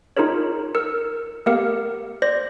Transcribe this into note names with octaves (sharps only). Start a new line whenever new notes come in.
D#4 F4 G#4 A#4 C#5
A#4 E6 C#7
A3 B3 G4 A#4 F5 C#7
C5 D5 A#6